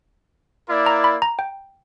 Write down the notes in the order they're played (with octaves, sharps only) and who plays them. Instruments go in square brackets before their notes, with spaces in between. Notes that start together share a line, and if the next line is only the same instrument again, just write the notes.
[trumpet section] A#3 E4 A#4 D5
[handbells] A#5
B5
A#5
G5